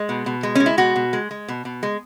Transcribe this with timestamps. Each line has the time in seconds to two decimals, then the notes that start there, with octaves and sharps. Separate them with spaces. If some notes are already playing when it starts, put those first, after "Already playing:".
Already playing: G#3
0.09 B2
0.26 B2
0.43 G#3
0.55 G#3 C#4
0.66 E4
0.78 B2 F#4
0.96 B2
1.13 G#3
1.31 G#3
1.48 B2
1.65 B2
1.83 G#3